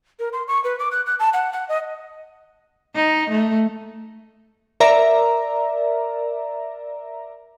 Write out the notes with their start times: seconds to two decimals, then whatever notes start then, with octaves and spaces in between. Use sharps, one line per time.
0.19 A#4
0.33 C6
0.48 C#6
0.64 B4
0.79 D6
0.91 F#6
1.06 F#6
1.19 A5
1.33 F#5
1.53 F#5
1.69 D#5
2.96 D#4
3.31 A3
4.80 A#4 D5 E5 A#5